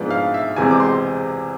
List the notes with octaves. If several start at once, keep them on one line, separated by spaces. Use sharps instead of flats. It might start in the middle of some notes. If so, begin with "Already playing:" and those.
Already playing: G#2 F3 G#3 B3 D4
F5
E5
E2 C3 G#3 C4 G#5
D6
C6